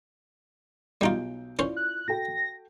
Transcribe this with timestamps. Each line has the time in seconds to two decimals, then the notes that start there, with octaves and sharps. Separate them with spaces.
1.01 B1 G3 D#4 F4 G6 D7
1.59 C#4 E4 F4 C5 D5
1.77 F#6
2.08 F#4 A4 G5 A#6